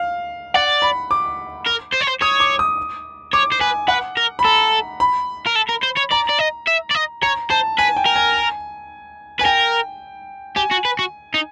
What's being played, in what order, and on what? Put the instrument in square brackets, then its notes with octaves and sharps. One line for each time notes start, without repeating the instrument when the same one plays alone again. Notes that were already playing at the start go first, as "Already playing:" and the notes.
Already playing: [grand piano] F5
[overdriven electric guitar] D5 [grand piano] F#5
[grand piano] B5
D6
[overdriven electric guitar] A#4
C5
C#5
C5
[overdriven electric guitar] C#5 [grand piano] D#6
[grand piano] D6
D#6
[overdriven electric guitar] C#5 [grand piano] D6
[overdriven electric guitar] C5
[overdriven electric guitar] B4 [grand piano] G#5
[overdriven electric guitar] B4 [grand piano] F#5
[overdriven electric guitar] A#4
[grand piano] B5
[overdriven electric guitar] A4 [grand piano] A#5
[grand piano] B5
[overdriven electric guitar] A#4
A4
A#4
C5
C#5
[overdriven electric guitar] D5 [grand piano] A#5
[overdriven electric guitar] D5
D#5
E5
D5
D#5
[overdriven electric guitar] C#5 [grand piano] A#5
[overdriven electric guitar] C5 [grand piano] A5
[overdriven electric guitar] B4 [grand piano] G#5
[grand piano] G5
[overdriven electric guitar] A#4
[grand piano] G#5
[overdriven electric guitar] B4 [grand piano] G#5
[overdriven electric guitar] A#4 [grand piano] G5
[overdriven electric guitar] G4 [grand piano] G#5
[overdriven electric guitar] F#4
B4
F#4
D#4